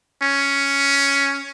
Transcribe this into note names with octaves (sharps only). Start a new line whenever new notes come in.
C#4